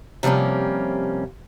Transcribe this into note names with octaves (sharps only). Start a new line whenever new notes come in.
C3 F3 G3 A#3 C#4